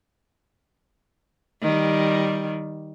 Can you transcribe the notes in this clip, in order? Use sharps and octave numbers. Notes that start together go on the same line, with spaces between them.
D#3 G3